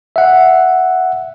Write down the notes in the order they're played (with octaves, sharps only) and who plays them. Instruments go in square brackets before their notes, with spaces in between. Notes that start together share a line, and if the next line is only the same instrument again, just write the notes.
[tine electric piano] E5 F#5